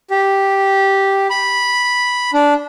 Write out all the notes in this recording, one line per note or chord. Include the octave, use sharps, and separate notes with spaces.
G4
B5
D4